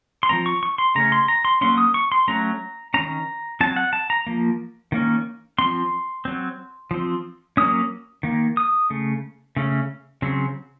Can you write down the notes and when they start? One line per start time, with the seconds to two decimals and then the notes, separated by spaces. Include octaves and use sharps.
0.23 C6
0.29 F3 A3 C4 A#5
0.46 C#6
0.63 C#6
0.78 C6
0.95 C#3 A3 C#4 A#5
1.12 C6
1.28 A#5
1.45 C6
1.61 F#3 A#3 C#4 C6
1.78 D#6
1.94 C#6
2.12 C6
2.28 F#3 A3 C#4 A#5
2.94 D#3 A#3 C#4 A#5
3.61 F#3 C4 A5
3.76 F#5
3.93 A5
4.10 A#5
4.27 F3 A#3
4.92 D#3 A#3 C#4
5.58 F3 C4 C6
6.25 F#3 C4
6.91 F3 C4
7.57 F#3 A#3 C#4 D#6
8.23 D#3 A#3
8.57 D#6
8.90 C#3 A3
9.56 C#3 A3 C#4
10.22 C#3 F#3 C4